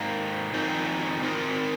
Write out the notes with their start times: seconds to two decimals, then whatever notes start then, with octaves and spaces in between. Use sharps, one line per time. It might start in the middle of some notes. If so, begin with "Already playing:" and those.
Already playing: G#2 D#3 A#3
0.54 F2 D#3 C4 D#4 G#4
1.22 D#3 C4 D#4 A#4